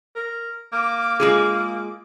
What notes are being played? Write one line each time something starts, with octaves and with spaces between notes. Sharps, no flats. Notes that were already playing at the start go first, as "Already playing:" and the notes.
A#4
A#3 D6
G#3 F4 G#4